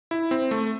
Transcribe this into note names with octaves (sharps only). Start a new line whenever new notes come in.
E4
C4
A3